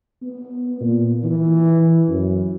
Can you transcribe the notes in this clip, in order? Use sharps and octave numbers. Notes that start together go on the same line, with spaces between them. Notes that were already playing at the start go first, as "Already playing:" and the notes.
B3
A#2
E3
F#2